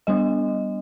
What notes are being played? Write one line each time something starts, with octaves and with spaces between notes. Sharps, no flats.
G3 B3 D4 D#5